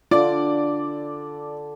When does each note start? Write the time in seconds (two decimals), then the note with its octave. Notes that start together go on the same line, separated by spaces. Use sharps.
0.11 D3 F4 D5 D6